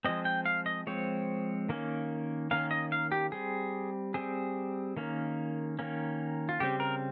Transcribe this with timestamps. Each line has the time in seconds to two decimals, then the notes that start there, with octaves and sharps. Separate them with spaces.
0.05 F3 G#3 C4 D#5
0.25 G5
0.46 F5
0.66 D#5
0.87 F3 G#3 C4 C#5
1.69 D#3 A#3 C#4
2.51 D#3 A#3 C#4 F5
2.71 D#5
2.92 F5
3.12 G4
3.32 G3 C4 G#4
4.14 G3 C4 G#4
4.97 D#3 A#3 C#4
5.79 D#3 A#3 C#4
6.49 F4
6.60 C#3 G3 C4 G4
6.80 A#4